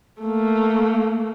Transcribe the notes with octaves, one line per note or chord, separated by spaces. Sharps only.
A3 A#3